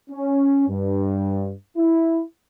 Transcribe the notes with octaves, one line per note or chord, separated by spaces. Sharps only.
C#4
G2
E4